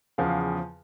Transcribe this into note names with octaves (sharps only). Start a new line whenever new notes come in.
E2 C#3 F3 F5